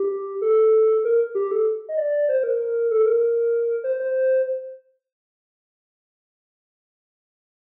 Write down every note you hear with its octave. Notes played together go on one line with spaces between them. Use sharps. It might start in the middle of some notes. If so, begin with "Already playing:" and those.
Already playing: G4
A4
A#4
G4
A4
D#5
D5
C5
A#4
A#4
A4
A#4
C5
C5